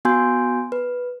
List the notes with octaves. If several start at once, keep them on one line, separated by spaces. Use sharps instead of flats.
B3 F#4 G#5 C6 G6
B4